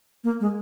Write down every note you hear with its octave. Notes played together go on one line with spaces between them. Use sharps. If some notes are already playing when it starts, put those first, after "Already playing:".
A#3
G#3